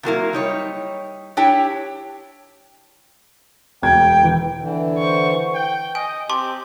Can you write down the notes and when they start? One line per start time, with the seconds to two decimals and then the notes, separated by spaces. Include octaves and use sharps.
0.03 C3 F#3 A#3 E4
0.33 G3 D#4 C#5
1.37 D4 E4 G4 C#5 G5
3.82 E1 G5 G#6
4.23 E3
4.58 D3 E3
4.98 C5 C#6
5.55 G5
5.95 D#5 G#5
6.30 C4 G4 A5 C6 D6